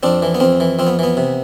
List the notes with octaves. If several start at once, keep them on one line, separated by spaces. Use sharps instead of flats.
F2 C4 D4
E3
B3
F2 C4
E3
F2 C4
B3
E3 B3
C3